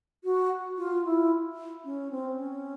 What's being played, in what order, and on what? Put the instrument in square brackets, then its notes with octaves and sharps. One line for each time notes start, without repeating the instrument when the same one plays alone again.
[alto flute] F#4
F4
E4
C#4
C4
C#4